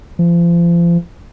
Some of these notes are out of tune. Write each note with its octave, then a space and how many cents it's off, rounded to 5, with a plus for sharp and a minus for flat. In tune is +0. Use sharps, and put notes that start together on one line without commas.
F3 -35